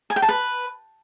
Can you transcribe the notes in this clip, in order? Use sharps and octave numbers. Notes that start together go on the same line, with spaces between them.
G#5
G5
A5
B4